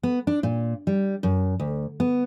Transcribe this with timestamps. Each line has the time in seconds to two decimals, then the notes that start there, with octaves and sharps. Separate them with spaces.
0.03 B3
0.27 D4
0.43 A#2
0.87 G3
1.23 F#2
1.60 D2
2.00 B3